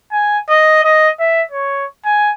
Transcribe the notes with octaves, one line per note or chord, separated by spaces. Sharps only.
G#5
D#5
D#5
E5
C#5
G#5